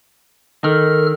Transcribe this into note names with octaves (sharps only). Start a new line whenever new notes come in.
D#3 A4 A#4 F6